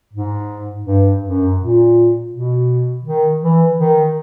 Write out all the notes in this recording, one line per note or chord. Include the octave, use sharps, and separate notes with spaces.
G#2
G2
F#2
A#2
B2
D#3
E3
D#3